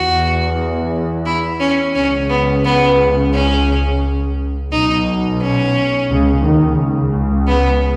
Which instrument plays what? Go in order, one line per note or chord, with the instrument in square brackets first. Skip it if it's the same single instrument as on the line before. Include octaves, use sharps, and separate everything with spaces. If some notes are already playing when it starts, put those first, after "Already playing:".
Already playing: [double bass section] E2 [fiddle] F#4
[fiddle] E4
C#4
[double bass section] C#2 C#3 [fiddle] C#4
[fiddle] B3
B3
C#4
[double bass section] B1 B2 [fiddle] D#4
[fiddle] C#4
[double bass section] C#2 C#3
D#2 D#3
C#2 C#3
[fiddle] B3